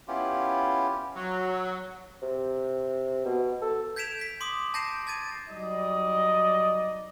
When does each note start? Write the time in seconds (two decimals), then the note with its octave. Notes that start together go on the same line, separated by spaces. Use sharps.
0.08 B3 C#4 E4 F4 G4
1.16 F#3
2.22 C3
3.26 B2
3.61 A4
3.96 G6 G#6 B6 D7 E7 F7
4.19 G6 B6
4.41 C6 D6 D#6
4.74 A5 G6 A#6 C7 D7 E7
5.07 A5 G#6 A6 D#7
5.49 F#3 G3 D#4 D5 D#5